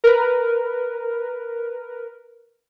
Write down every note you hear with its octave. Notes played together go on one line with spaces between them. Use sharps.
A#4 B4